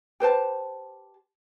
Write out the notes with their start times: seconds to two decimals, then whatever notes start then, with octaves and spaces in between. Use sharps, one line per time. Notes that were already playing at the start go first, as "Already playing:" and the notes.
0.20 G4 B4 C5 A5